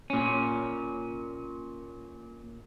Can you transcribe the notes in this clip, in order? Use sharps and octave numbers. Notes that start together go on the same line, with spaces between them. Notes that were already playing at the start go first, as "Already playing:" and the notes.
A#2 C#4